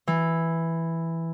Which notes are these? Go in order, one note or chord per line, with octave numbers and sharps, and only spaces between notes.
E3